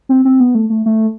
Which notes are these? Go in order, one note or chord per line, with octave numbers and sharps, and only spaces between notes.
C4
C4
B3
A3
A3
A3